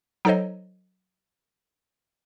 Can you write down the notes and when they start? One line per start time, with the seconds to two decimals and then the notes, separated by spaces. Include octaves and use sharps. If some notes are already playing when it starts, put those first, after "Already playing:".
0.25 F#3 D#4 A4 C5 C#5 D#5